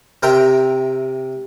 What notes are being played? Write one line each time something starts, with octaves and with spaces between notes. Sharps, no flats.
C3 A#4 E5 G5 A#5 C6